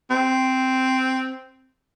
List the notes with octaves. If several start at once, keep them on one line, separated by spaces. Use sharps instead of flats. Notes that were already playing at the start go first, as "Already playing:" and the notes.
C4